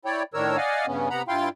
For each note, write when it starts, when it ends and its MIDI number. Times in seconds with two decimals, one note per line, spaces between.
0.05 0.23 64
0.05 0.23 73
0.05 0.23 74
0.05 0.23 79
0.34 0.57 45
0.34 0.57 51
0.34 0.57 62
0.34 0.57 70
0.34 0.57 73
0.34 0.57 88
0.57 0.86 74
0.57 0.86 75
0.57 0.86 77
0.57 0.86 78
0.57 0.86 80
0.87 1.09 43
0.87 1.09 49
0.87 1.09 59
0.87 1.09 61
1.10 1.22 48
1.10 1.22 59
1.10 1.22 78
1.10 1.22 82
1.10 1.22 83
1.28 1.49 43
1.28 1.49 64
1.28 1.49 65
1.28 1.49 77
1.28 1.49 79
1.28 1.49 84